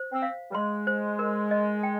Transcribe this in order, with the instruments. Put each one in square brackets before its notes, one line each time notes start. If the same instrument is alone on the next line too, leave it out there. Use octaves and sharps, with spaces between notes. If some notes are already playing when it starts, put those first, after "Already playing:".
Already playing: [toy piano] C5
[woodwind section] C4
[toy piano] F5
[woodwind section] G3
[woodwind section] G#3 [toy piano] C6
[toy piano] C5
A#4
D#5
G5